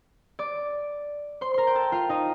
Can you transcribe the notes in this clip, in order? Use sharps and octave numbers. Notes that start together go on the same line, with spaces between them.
D5 D6
C5 C6
A#4 A#5 C6
G5
A4 A5
F4 F5
D#4 D#5